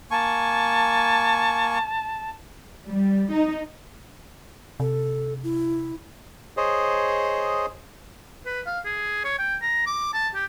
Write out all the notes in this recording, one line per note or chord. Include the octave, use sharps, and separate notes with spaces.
A#3 G#5 A5 C#6
G3
D#4
C3 A4
E4
G#4 C5 C#5 D#5
B4
F5
G#4
C#5
G5
A#5
D6
A5
G4